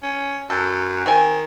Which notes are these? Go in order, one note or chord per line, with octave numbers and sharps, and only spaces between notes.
C#4
F#2 A4
D#3 C4 G#5